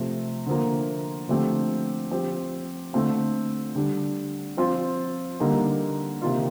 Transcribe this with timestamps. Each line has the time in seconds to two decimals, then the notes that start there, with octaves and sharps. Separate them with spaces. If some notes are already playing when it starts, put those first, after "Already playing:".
Already playing: C3 F3 A3
0.46 D3 F3 A#3
1.28 D3 F3 A3 C4 G4
2.11 F3 C4 G4
2.93 D3 A3 C4 F4
3.75 D3 G3 D4
4.57 F3 C4 F4
5.40 D3 G3 A#3 D#4
6.22 C3 D#3 A#3 F4